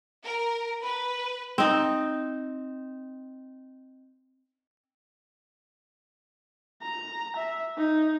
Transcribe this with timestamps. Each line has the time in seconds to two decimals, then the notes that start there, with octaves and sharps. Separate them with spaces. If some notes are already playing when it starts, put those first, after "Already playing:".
0.24 A#4
0.81 B4
1.58 C4 D#4
6.82 A#5
7.36 E5
7.77 D#4